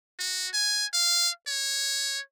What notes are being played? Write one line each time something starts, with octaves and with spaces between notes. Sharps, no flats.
F#4
G#5
F5
C#5